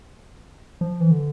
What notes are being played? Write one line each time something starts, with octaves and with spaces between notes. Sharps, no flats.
F3
E3
D3